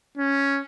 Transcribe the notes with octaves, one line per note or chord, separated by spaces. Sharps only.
C#4